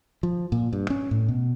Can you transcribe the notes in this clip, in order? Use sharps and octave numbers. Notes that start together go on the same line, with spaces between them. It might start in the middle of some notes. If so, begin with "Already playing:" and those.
F3
A#2
G2
C#4
A2
B2